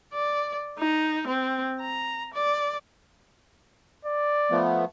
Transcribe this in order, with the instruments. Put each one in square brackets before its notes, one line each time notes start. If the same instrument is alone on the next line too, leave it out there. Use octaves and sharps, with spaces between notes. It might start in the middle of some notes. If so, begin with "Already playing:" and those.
[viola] D5
D#4
C4
A#5
D5
[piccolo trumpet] D5
[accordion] F3 A3 B3